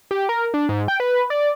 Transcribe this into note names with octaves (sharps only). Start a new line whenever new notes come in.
G4
A#4
D4
G#2
G5
B4
D5